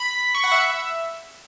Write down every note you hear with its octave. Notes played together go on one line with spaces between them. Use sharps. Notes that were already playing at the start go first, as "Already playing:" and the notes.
Already playing: B5
C#6
F#5
E5